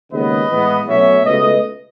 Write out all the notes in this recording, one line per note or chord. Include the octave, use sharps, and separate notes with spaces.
D#2 C#3 G#3 B3 B4 D#5
A2 E3 G#3 B3
B2 F#3 A3 C#4 C#5 E5
C#2 B2 A3 B4 D#5